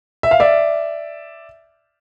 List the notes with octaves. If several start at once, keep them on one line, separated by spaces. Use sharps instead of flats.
E5
F5
D5 E5